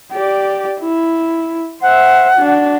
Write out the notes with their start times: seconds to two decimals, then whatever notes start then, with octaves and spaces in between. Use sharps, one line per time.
0.13 G4 D5
0.80 E4
1.82 C5 E5 F#5
2.36 D4 F#4